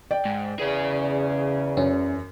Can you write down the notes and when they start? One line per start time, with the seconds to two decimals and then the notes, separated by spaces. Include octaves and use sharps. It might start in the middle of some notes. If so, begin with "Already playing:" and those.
0.11 D5 G5
0.25 G#2
0.59 E2 C#3 G#4
1.77 F#2 C#4